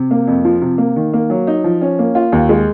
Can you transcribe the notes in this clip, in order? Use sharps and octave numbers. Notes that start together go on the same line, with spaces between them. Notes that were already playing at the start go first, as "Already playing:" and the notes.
Already playing: C3
A#3
F2
F3
C3
A#3
D#3
A#3
F#3
D#4
F3
C#4
A#3
F4
D#2
G#3